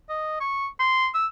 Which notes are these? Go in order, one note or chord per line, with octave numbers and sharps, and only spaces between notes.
D#5
C#6
C6
E6